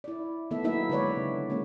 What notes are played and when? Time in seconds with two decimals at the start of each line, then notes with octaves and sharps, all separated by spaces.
0.04 E4 D5
0.51 D#3 A3 B3 A4 E5
0.64 F#3 A#3 D#4 E4 E5
0.89 D3 G#3 B4 C#5 D5
1.17 C#3
1.50 G#3 A#3 C#4